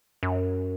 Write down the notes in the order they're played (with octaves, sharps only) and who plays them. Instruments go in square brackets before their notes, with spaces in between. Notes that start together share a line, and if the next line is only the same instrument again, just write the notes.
[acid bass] F#2